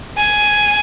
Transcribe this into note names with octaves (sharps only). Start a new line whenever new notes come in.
G#5